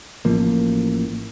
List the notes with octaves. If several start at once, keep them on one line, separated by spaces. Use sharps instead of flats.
A1 F3 A#3